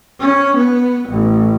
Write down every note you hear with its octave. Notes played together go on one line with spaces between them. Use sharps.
C#4
B3
A1